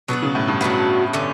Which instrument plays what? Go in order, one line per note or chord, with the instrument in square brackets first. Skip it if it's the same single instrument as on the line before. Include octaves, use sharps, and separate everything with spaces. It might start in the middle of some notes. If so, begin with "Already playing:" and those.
[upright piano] B2 [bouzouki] F#3 B3 D4 F#4
[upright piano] C#3
A2
G2
[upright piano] A2 [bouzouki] F#3 B3 D4 F#4
[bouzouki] D3 A3 C#4